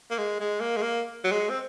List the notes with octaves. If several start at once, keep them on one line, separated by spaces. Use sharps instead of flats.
A#3
G#3
G#3
A#3
G#3
A#3
F#3
G#3
C4